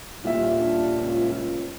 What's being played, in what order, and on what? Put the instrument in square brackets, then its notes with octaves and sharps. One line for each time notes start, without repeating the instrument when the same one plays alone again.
[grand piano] D#1 A#2 E5 [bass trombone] G3 [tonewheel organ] F4
[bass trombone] D4
C#2